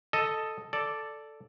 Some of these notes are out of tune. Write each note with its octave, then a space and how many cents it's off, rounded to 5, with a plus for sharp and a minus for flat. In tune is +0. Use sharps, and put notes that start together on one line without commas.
A4 +0 D#5 +0
A4 +0 D5 +0